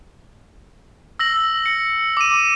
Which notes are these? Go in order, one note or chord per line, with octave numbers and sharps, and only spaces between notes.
E6 A#6 F#7
C#7
D6 D#7